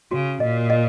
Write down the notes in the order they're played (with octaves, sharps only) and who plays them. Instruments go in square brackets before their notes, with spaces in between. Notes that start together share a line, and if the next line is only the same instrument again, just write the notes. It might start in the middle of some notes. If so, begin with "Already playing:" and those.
[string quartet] C#3 [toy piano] F#4
[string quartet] A#2 [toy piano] D#5
[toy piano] D#5